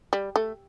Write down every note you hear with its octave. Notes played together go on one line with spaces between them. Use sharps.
G3
A3